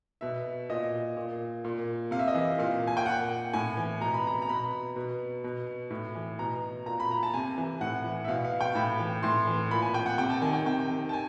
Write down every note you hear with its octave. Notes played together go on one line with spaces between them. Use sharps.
B2 E5
A#2 D#5
A#2
A#2
C3 F5
E5
D#5
E3 E5
A#2 F5
G#5
G5
A#2 F#5
A2 G#5
E3
B2 A#5
B5
A#5
A#5
B2 B5
B2
B2
A2
E3
B2 A#5
A#2 A#5
B5
A#5
A5
C3 G#5
E3
A2 F#5
E3
E5
B2 F5
F5
G5
A2 B5
E3
A2 C6
E3
A#2 B5
G#5
G5
F#5
C3 G5
A5
D#3 G#5
G5
C3 G5
D#3
A5
G#5